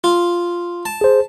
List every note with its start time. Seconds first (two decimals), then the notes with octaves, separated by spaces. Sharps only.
0.04 F4
0.85 A5
1.01 G#4 C5